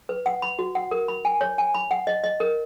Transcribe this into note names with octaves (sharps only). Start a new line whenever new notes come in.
B4
F#5
B5
F#4
F#5
A#4
B5
G#5
C#5
G#5
B5
F#5
D#5
D#5
A#4